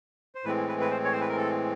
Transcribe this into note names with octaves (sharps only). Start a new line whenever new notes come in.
C5
A2 E3 G#3 C4 B4
B4
B4
C5
C#5
C5
B4
A#4
A4